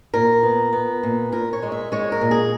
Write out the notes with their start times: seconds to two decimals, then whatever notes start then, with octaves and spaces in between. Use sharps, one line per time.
0.14 A#2 A#4
0.43 B3
0.73 B3
1.03 A#2
1.32 A#2 A#4
1.53 C#5
1.62 G#3
1.72 E5
1.92 G#3 C#5
2.12 A#4
2.21 A#2
2.31 G#4